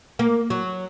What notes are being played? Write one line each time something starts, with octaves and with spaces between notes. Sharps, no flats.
A#3
F#3